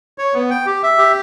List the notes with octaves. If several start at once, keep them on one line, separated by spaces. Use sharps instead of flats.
C#5
B3
G5
G4
E5
G4